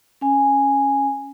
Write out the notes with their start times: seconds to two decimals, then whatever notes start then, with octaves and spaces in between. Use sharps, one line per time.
0.21 C#4 G#5